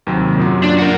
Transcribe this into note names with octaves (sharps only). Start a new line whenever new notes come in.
D#2 C3 F#3
F#2 A#2 F#3
D4
F#4 A#4